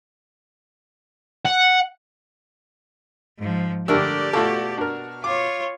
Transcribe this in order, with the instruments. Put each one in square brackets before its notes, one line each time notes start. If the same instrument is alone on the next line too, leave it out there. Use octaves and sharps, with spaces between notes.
[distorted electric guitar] F#5
[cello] G#2 F3
[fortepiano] D3 G3 E6 [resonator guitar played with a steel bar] A3 D4 A#4 [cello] G4 D5
[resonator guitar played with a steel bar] B2 F#4 [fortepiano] A3 F4 A4
[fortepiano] D4 A#4
[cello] F4 C#5 [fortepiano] D6